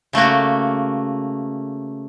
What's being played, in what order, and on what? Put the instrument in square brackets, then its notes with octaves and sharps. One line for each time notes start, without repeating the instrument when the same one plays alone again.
[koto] C#3 A3 A#3 F#4